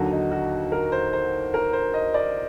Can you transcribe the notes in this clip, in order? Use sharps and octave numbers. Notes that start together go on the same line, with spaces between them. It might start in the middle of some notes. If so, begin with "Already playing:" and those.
Already playing: D#2 D3 F#3 F#4
D#4
F#4
A#4
C5
C5
A#4
C5
D#5
D5